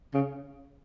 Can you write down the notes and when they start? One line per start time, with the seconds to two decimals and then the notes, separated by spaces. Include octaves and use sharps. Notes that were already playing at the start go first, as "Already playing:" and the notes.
0.14 C#3